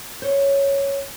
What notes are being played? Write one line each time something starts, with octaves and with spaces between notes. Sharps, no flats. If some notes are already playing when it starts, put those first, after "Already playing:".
C5 C#5